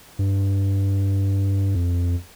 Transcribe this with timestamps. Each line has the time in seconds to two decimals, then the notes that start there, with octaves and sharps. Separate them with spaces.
0.19 G2
1.75 F2